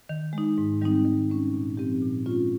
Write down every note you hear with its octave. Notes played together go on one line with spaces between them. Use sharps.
D#3
G#3
D#4
G#2
D#3 G3 C4 D#4
D#3
G#3 C#4
A#2
F3 C4 G4
A#2
G#3 C#4 F4